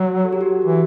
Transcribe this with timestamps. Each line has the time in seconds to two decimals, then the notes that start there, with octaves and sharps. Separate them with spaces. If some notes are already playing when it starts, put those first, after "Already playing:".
Already playing: F#3 F#4
0.25 A4
0.33 G4
0.41 F#4
0.47 G4
0.65 E3